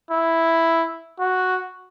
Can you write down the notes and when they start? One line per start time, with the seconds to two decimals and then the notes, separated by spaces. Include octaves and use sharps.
0.11 E4
1.20 F#4